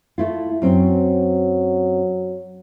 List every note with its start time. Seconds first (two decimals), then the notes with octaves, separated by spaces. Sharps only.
0.18 A3 E4 F4
0.62 F#2 F#3 C4 C#4